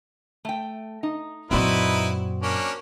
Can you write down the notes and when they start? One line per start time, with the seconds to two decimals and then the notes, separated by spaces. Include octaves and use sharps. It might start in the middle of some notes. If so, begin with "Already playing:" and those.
0.45 A3 G5
1.03 D#4
1.51 F#2 A#2 C4 D#4 E4 F#4 B4 D5
2.42 A#3 C#4 D4